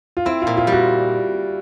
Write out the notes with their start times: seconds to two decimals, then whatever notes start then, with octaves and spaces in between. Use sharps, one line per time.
0.17 F4
0.26 C4 E4
0.42 F4
0.47 A#2
0.57 F4
0.67 G3
0.72 F#4